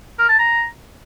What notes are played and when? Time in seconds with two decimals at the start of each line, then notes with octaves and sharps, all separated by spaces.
0.19 A#4
0.29 A5
0.39 A#5